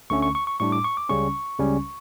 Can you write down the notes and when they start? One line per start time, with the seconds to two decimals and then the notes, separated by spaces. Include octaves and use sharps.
0.10 D2 D3 A3 C#4 C#6
0.22 C#6
0.35 C#6
0.47 C#6
0.60 A2 G3 D4 C#6
0.72 D6
0.84 C#6
0.97 D6
1.09 C#2 C#3 G3 C#4 C#6
1.59 C#2 C#3 G3 C#4